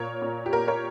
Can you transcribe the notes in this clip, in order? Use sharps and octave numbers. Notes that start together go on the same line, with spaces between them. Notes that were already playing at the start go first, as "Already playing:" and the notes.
Already playing: A#2 A#4 C#5
A#2
G4
A#2 A#4
A#4 C#5